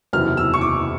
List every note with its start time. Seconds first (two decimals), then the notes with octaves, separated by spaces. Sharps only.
0.13 F#1 E2 C3 D#3 F#3 F6
0.37 E6
0.54 C#6
0.61 D6